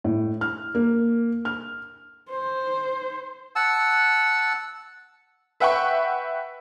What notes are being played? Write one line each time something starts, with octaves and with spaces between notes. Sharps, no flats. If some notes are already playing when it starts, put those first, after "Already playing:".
A2
F6
A#3
F6
C5
F#5 A5 E6
B4 E5 F#5 G5 B5 C#6